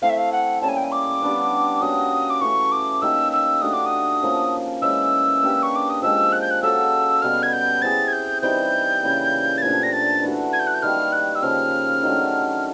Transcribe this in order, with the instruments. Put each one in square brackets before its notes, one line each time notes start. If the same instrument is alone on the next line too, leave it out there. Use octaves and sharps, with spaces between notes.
[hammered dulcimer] A3 C4 E4 [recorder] F5
[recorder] E5
F5
F#5
[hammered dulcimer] G3 A#3 C#4 [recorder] A5
[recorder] G#5
G5
G#5
D6
[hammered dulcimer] G3 B3 D4
[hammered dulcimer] A#3 C#4 F#4 [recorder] D#6
[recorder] D6
[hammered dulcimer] E3 A3 C#4 [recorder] C#6
[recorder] D6
[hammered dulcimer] A#3 D#4 G4 [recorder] E6
[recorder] E6
[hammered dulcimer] A3 D4 F#4 [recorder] D#6
[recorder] D6
D#6
[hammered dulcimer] F3 A#3 C#4
[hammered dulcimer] E3 G#3 C#4 [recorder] E6
[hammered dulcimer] A#3 D4 G4 B4
[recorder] C#6
D6
D#6
[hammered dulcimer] F3 G#3 C4 [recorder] E6
[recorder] F#6
G6
F#6
[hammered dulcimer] A#3 C#4 F#4 A4 [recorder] E6
[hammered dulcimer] B2 G3 B3 [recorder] F6
[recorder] G#6
G6
[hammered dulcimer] C4 E4 G#4 [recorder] A6
[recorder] G#6
G6
[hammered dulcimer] E3 G3 C4 D#4 [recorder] G6
[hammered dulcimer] C#3 E3 G3 A#3
[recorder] A6
[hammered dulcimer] A#2 F3 A3 D4 [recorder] G#6
[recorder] A#6
A6
[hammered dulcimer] E3 A3 D4 F#4
[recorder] G#6
G6
F#6
G6
[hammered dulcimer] D#3 G3 A#3 [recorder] F6
[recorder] F#6
E6
[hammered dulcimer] C#3 F3 A#3 [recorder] F6
[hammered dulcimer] D#3 F#3 A3 D4